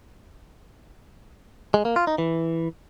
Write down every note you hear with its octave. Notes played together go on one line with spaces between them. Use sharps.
G#3
A#3
F4
D#4
E3